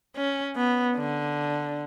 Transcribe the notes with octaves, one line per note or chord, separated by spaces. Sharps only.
C#4
B3
D3